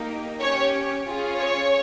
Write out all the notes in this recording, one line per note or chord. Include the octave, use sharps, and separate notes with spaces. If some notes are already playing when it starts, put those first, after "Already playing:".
Already playing: A#3 D#4 G4
C#4 G4 C#5
C#4 F4 G#4
C#5